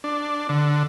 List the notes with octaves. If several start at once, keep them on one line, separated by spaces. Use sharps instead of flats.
D4
D3